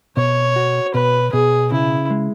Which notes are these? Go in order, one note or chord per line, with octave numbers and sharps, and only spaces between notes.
B2 C#5
F#4
B2 B4
B2 G#4
C#3 E4
G#3